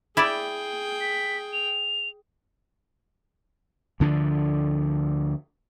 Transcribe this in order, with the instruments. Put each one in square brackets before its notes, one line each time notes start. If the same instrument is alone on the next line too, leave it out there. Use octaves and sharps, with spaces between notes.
[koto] E4 D5 [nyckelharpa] G#4 G5
[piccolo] B6
F7
[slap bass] D2 D3 F3 D4